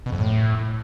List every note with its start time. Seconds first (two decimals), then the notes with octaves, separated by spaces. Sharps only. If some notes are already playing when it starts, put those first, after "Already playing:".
0.06 B2
0.12 F2
0.18 A2